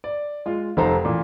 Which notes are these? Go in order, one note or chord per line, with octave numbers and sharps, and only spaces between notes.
D5
G#3 F4
F1 D#4 A4 C5 A#5
A1 A#2